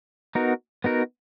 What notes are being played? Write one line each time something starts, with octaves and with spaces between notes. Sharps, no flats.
B3 D#4 F#4 A#4
B3 D#4 F#4 A#4